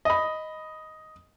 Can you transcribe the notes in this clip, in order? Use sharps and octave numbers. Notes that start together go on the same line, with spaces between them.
D#5 B5